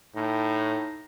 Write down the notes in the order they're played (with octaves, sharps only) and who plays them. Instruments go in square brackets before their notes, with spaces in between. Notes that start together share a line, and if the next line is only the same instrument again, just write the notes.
[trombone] A2 [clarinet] D#4